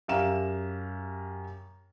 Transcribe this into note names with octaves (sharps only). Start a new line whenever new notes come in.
F#2 G4 E5 F5 A#5 E7